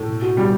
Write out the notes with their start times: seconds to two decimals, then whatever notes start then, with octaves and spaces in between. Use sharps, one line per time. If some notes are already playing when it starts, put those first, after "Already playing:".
Already playing: A2 A3
0.08 B2
0.22 F#4
0.36 B2 G3